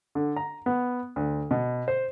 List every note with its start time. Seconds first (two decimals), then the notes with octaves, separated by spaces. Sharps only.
0.15 D3
0.36 A#5
0.66 B3
1.16 D2
1.51 B2
1.88 C5